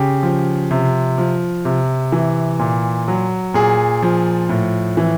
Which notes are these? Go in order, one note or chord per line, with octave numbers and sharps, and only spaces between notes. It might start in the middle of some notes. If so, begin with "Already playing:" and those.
Already playing: C#3 G4
F3
C3
F3
C3
E3
A#2
F#3
A#2 G#4
F3
A2
E3